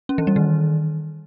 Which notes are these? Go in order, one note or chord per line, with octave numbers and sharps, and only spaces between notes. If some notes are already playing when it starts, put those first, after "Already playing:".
C#4
E3
G3
D#3